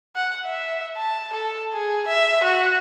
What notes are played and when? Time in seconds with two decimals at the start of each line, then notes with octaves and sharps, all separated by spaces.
0.16 F#5
0.46 E5
0.97 A5
1.33 A4
1.73 G#4
2.07 E5
2.44 F#4